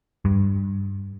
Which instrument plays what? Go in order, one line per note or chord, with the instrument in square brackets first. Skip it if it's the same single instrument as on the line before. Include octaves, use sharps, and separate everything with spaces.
[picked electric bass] G2